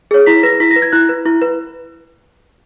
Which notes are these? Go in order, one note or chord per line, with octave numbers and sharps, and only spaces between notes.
G#4 C#5
E4 B6
B4 A#6
E4 B6
A#6
B4
G#6
E4 F#6
B4
E4
B4